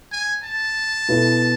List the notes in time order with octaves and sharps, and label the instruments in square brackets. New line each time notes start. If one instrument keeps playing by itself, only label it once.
[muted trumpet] G#5
A5
[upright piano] B2 B3 E4 A4